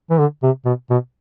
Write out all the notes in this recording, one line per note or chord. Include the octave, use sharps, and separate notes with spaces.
E3
D3
C3
B2
B2